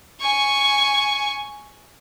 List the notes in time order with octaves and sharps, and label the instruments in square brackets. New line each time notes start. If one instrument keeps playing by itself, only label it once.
[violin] G#5 C#6